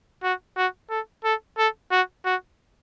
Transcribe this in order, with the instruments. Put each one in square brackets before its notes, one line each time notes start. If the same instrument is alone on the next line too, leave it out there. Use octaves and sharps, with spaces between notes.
[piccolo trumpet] F#4
F#4
A4
A4
A4
F#4
F#4